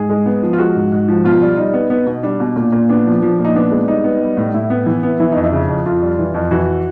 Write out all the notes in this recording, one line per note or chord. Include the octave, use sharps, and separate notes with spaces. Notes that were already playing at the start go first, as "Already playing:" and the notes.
Already playing: G#2 G#4
G#3
B3
F3
F4
G#3 F#4
G#2
G#2
F3
B2 F4
G3
G3 D#4
B3
B3
B2
G3 D4
B2
A#2
A#2
B3 D4
F3
F3
A#2
D#4
B3 D4
G#3
G3 D#4
B3
G3
A2
A2 E4
B3
E3
B3
E3 E4
F2 D#4
E4
C#3
F2
F2 F4
G3
E3
F2
E3 F#4